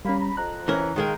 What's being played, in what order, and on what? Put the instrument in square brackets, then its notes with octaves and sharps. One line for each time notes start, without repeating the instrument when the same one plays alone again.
[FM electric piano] G3 C#4 [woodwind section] A#3 B5
[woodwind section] A#5 B5
[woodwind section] F2 [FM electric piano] A#5 F#6
[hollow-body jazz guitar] E3 C#4 A#4
[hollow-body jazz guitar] D#3 G#3 A#4 [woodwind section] F5 G5